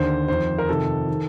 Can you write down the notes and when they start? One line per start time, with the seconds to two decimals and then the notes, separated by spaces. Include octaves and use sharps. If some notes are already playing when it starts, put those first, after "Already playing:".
Already playing: D#2 D3 C5
0.28 F2 D#3 C5
0.58 A#4
0.68 F2 C3 D#3 A4
1.08 D#3